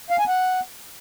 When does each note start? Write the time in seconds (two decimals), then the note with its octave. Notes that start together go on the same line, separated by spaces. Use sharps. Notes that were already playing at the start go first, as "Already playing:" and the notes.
0.10 F5
0.19 G#5
0.27 F#5